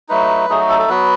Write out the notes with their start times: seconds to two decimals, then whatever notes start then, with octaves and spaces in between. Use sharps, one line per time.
0.09 F#3 A3 D#4 B4
0.50 F#3 A3 D#4 G#4
0.60 F#4
0.69 A4
0.79 A4
0.89 F#3 B3 F#4 B4